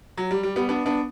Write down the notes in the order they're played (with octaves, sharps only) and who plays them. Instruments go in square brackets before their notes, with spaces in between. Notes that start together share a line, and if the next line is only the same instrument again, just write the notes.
[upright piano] F#3
G3
G3
G3 B3
B3 D4
B3 D4